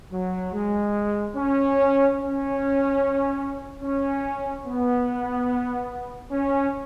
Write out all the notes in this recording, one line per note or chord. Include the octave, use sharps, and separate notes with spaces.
F#3
G#3
C#4
C#4
C#4
B3
C#4